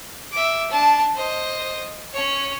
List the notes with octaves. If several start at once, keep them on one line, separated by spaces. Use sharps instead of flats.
E5 D6
D4 A5
C5 D#5
C#4 C#5